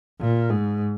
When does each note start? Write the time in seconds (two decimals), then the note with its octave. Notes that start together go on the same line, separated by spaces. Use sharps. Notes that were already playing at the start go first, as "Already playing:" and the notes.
0.21 A#2
0.50 G#2